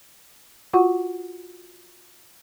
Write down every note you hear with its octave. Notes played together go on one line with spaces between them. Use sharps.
F4 F#4 F#5 C#6